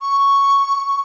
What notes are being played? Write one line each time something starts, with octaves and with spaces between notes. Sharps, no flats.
C#6